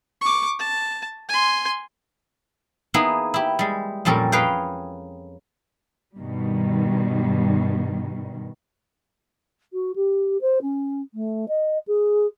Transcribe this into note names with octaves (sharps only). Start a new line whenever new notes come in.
C#6 D6
A5
G#5 C6
A#3 B3 D#4 E4 G#4
E4 G4
G3 G#3
F2 A#2 G3 C#4 A4 A#4
G#4 A#4 B4 C#5 F5 G5
G2 B2 D#3 G3
F#4
G4
C5
C#4
A3
D#5
G#4